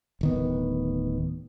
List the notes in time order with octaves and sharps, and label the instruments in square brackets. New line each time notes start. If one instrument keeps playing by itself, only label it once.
[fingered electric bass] D1 D#3 B3